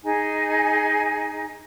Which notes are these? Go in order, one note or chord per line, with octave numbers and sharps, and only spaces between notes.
D#4 G#4 G#5